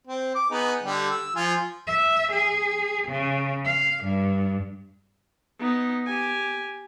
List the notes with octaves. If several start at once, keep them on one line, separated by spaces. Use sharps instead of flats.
C4
D6
B3 D#4 G#4
D3 G3 G4
E6
F3 F4 G#5
E5
G#4
C#3
F5
G2
B3 D#4
G4 G#5